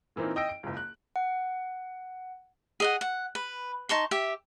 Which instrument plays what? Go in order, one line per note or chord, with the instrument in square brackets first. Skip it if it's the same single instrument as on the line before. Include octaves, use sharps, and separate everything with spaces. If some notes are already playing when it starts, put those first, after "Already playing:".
[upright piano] A#2 E3 A#3 C4 D#4
D#5 G5 E6 D7
D7
F#1 C#2
F#6
[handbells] F#5
[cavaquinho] G#4 D#5 F#5
F#5
B4
D#4 A5 C6 C#6
G4 E5